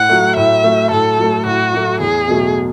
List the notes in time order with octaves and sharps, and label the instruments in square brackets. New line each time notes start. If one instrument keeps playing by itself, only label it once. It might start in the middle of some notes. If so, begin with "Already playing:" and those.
Already playing: [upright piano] A2 [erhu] F#5
[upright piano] F#3 A3
[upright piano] A2 [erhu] E5
[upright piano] F#3 A3
[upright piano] A2 [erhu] A4
[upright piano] F#3 A3
[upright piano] A2 [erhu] F#4
[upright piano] F#3 A3
[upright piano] E2 [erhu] G#4
[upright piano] B2 F#3 A3